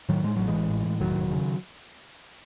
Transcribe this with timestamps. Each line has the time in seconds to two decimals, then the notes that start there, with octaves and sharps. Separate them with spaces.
0.09 A2 D#3 F#3
0.23 A2 G#3
0.37 A1 F#3
0.48 E3 G#3
0.55 A2
0.70 A1
0.86 A2
1.00 E1 D#3 F#3
1.17 E1
1.32 C#3